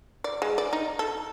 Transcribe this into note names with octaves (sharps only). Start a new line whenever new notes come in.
D5
G#3
D5
D#4
A4